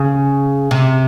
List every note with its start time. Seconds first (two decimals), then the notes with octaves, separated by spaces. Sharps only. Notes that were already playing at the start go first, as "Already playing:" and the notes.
Already playing: C#3
0.71 C3